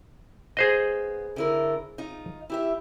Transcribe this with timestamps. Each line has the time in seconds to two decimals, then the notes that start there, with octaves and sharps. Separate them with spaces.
0.57 B3 G#4 C5 D#5
1.36 D3 E4 A#4
1.98 D#4 F4
2.50 E4 G4 E5